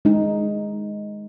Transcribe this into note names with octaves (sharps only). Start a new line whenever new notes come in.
G#3 D#4